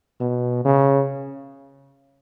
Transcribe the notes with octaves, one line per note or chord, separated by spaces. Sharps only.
B2
C#3